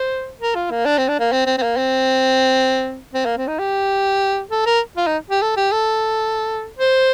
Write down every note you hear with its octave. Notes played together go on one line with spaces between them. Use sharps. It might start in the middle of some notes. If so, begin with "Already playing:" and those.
Already playing: C5
A#4
F4
A#3
D4
C4
D4
A#3
C4
C4
C4
A#3
C4
C4
A#3
C4
D#4
G4
A4
A#4
F4
D#4
G4
A4
G4
A4
C5